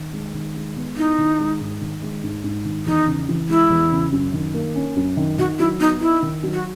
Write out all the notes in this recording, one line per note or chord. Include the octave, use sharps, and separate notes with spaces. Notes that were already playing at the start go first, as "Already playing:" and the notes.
Already playing: D#3
G#3
D#3
G#3
B3
D#4 E4
D#3
G#3
G#2
D#3
G#3
G#2
G#2
D#3
E2 D#4
C#3
E3
G#3 E4
E2
C#3
F#2
D#3
A#3
C#4
F#2
D#3
D#3 F#4
F#3 E4
B3 D#4
D#4 E4
D#3
F#3
F#4